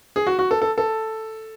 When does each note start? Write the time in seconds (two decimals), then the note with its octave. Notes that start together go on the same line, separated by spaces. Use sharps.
0.16 G#4
0.27 F#4
0.39 F#4
0.51 A4
0.62 A4
0.78 A4